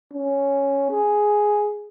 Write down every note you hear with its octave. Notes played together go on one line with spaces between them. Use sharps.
C#4
G#4